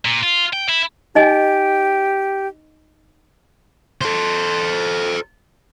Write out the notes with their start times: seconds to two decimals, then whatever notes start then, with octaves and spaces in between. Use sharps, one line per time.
0.05 A#2
0.23 F4
0.53 G5
0.69 E4
1.15 D#4 G4 D#5 G#5
4.01 A4 C5